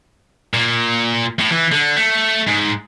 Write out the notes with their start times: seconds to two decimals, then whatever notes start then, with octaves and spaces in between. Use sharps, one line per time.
0.54 A#2
1.39 A2
1.51 E3
1.72 D3
1.96 A3
2.47 G#2